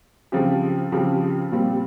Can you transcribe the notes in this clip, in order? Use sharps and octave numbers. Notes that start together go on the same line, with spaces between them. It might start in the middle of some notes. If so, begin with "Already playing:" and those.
C#3 F3 C4 G4
C#3 F3 C4 G4
A#2 G3 C4